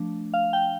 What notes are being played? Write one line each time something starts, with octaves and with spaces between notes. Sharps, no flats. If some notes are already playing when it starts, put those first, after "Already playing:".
Already playing: F3 A3 D4
F5
G5